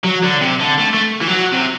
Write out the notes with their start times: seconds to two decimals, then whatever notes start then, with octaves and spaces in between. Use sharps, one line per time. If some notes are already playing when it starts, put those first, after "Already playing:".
0.04 F#3
0.24 D3
0.41 C3
0.61 D3
0.79 A3
0.94 A3
1.22 E3
1.28 F#3
1.53 C3